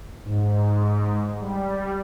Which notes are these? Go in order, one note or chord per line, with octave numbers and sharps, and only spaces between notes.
G#2
G3